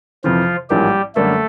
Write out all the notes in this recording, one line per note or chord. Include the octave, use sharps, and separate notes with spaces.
F2 C3 E3 F3 F4
A1 G#2 F3 G3 A#3 G4
F#2 D3 G3 A3 A#3 A4